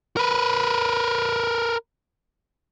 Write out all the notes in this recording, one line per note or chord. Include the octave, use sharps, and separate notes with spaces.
A#4 B4